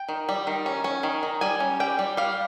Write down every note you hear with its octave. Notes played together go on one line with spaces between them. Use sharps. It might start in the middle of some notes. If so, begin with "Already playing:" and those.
Already playing: G5
D#3
G3
D#3
C#4
C#4
D#3
D#3
G3 G#5
C#4
G3 G5
G3
G3 F5